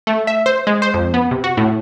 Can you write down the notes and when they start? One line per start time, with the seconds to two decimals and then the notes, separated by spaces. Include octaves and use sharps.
0.07 A3
0.27 E5
0.46 C5
0.67 G#3
0.82 C5
0.94 F2
1.14 B3
1.31 C3
1.44 F#4
1.57 A2